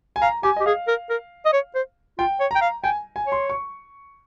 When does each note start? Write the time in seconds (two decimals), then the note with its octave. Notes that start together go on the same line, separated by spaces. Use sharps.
0.16 G#5
0.22 F5 A#5
0.43 G4 G#5
0.57 G4 D#5
0.66 G#4 F5
0.88 A#4
1.10 A#4
1.46 D#5
1.53 C#5
1.75 C5
2.19 F4 G5
2.40 C#5
2.51 G5 A#5
2.62 F5
2.84 G5 G#5
3.16 G#5
3.27 C#5 C6
3.50 C#6